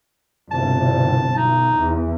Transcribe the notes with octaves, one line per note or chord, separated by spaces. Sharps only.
G1 C2 B2 A5
B1 D#4
E2